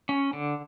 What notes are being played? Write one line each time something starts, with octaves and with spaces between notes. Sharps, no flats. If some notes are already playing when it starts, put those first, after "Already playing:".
C#4
D3